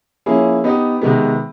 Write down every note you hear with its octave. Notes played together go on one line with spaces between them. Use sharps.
F3 A#3 C#4 E4 G#4
B3 D#4 G4
C3 D#3 G#3 B3